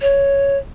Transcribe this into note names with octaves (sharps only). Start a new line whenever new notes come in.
C#5